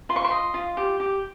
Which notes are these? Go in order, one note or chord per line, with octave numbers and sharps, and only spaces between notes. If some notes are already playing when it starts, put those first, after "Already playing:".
F4 C6
C#6
C6
D#5
F4
G4
G4